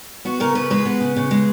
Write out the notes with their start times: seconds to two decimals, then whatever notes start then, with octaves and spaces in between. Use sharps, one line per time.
0.25 B3 F#4
0.40 C#3 A#4
0.55 C#3 B4
0.70 G#3 B4
0.85 B3
1.01 C#3
1.16 C#3
1.31 G#3